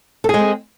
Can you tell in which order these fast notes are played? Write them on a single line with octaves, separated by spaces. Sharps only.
A4 G#4 G#3 C4